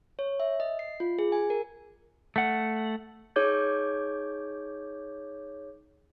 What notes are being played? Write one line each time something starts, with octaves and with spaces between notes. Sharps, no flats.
C#5
E5
D#5
C7
F4
G#4
G#5
A#4
A3 F#5
D#4 G#4 C#5 D6 G6 G#6